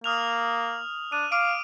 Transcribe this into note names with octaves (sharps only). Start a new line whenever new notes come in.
A#3 D#6 F6 F7
D4 D#7
F5 D6 D7